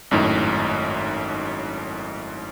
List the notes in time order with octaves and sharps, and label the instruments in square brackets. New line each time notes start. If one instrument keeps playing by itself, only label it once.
[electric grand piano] G#1 F#2 A2 D#4